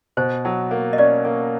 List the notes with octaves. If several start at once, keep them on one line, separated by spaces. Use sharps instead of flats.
B2 C5
F#3
A#3
D#5
C#4 D5
A#3